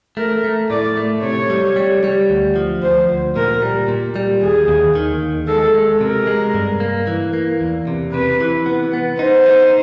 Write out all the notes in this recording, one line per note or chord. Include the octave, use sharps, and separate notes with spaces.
A3 A#4
A3
A2 D5
A3
C3 C#5
G3
G3
G3
D2
F3
D2 C5
D2
A#2 A#4
G3
A#2
G3
D#2 G#4
D#2
D#3
D#2
G#3 A4
G#3
C3 A#4
G#3
G2
A#3
E3
A#3
E2
C3
C3 B4
E3
B3
B3
D#4 C5
D#4